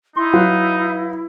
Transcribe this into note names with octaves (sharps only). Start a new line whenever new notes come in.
D#4 E4 C6
F#3 B4 F5